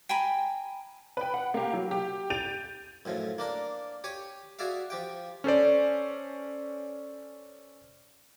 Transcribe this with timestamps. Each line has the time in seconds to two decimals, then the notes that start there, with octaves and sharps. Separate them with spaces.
0.09 G5 G#5 A#5 B5
1.17 B4 G5
1.34 F#5
1.54 A#3 G4
1.73 F#3
1.91 G4
2.30 G6 A6 D7 D#7 F7
3.05 F#2 A2 F3
3.38 A#3 D4 A#4
4.04 G4 C#5 G#5
4.59 F#4 G#4 D5 E5 F5
4.90 F3 G4 G5
5.44 C#4 A4 C5 D5